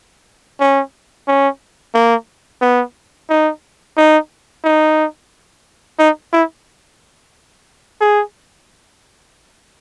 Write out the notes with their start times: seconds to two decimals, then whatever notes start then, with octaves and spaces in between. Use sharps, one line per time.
0.60 C#4
1.28 C#4
1.95 A#3
2.62 B3
3.29 D#4
3.97 D#4
4.64 D#4
5.99 D#4
6.33 E4
8.01 G#4